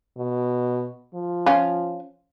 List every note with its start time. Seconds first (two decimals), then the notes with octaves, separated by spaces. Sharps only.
0.17 B2
1.14 F3
1.46 C#4 F4